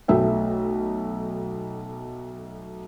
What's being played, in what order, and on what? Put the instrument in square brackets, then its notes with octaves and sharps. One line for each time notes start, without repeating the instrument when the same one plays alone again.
[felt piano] B1 A3 E5 G5